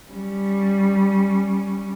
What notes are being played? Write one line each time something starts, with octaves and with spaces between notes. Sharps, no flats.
G3 C#4